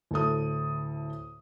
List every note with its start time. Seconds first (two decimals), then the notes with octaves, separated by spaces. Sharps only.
0.11 D2 A2 A4 D#6